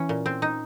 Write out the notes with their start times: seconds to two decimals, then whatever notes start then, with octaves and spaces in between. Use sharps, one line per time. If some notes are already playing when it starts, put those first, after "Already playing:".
Already playing: E3 C#4
0.09 A#2
0.26 C4
0.42 D#4